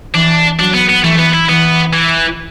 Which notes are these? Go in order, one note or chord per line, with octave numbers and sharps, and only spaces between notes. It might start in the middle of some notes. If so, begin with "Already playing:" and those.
E3 D4
F#3 D4
B3
B3
E3 A3
B3
E4
E3 B3
E3